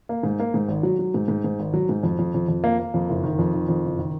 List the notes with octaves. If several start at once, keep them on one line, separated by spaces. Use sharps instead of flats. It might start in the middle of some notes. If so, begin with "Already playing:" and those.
A#3
G#2
A#3
G#2
G#1
F#3
F#3
G#2
G#2
G#2
G#1
F#3
G#2
F2
F2
F2
F2
A#3
A#3
F2
F#1
D#3
F2
D#3
F2
F#1
D#3